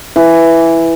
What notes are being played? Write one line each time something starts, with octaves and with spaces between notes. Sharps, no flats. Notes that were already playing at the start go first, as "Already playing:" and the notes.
E3